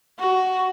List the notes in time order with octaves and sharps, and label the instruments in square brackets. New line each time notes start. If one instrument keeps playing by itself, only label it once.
[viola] F#4